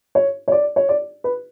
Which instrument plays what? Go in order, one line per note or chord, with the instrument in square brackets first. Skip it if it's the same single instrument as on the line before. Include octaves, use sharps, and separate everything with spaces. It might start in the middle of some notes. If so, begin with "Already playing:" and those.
[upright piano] C#5
C#5
D5
C#5
D5
B4